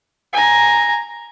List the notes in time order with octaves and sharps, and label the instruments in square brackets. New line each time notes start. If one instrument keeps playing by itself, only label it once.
[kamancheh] G#5 A#5